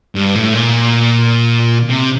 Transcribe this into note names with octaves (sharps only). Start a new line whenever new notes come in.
G2
A2
A#2
C3